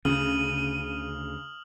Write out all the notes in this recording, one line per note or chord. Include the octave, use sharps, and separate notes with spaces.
D2 C#3 D#6 F6 D#7 F#7